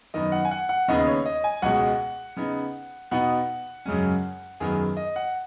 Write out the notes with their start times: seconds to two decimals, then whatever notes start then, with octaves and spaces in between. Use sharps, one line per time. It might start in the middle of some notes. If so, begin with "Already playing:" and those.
0.14 F#2 D#3 B3 D#4 D#5
0.32 F#5
0.45 G#5
0.51 F#5
0.69 F#5
0.88 D#2 C#3 B3 D#4 D#5
1.07 C#5
1.26 D#5
1.44 G#5
1.62 C#2 B2 G#3 F#5
2.36 C#3 B3 D#4
3.11 B2 B3 D#4 F#5
3.86 F#2 C#3 G#3 C#4
4.60 F#2 D#3 B3 G#4
4.97 D#5
5.16 F#5